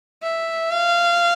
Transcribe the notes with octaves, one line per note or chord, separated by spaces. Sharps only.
E5
F5